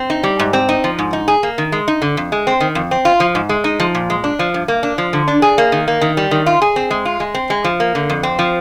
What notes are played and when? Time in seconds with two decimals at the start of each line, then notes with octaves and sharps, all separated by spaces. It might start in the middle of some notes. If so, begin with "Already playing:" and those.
Already playing: C4
0.10 D#4
0.23 G3
0.39 G#2
0.53 C4
0.69 D#4
0.84 F3
0.99 G#2
1.13 D#4
1.28 G#4
1.43 A#3
1.58 D#3
1.72 G#3
1.88 D#4
2.02 D3
2.17 F2
2.32 G#3
2.47 C4
2.61 D#3
2.75 F2
2.91 C4
3.05 F4
3.20 F3
3.35 G#2
3.49 G#3
3.64 D#4
3.80 F3
3.95 A#2
4.10 G#3
4.24 D4
4.39 F3
4.54 G2
4.68 A#3
4.83 D4
4.98 F3
5.13 D3
5.28 D4
5.42 G#4
5.58 A#3
5.72 D#3
5.88 A#3
6.01 D#3
6.17 G3
6.31 D#3
6.46 F4
6.62 G#4
6.76 C4
6.91 G#3
7.05 F4
7.20 G#3
7.35 C4
7.50 G#3
7.64 F3
7.80 A#3
7.95 D3
8.10 F2
8.23 C4
8.39 F3